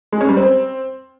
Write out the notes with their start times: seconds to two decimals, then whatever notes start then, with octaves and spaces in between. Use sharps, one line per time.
0.12 G#3
0.21 C#4
0.29 G3
0.37 C4